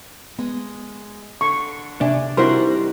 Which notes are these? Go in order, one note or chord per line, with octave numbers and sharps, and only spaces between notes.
G#3 B3
D3 C#6
C3 D4 E5 G#5
G3 C4 D#4 E4 F#4 A#4 C5 C6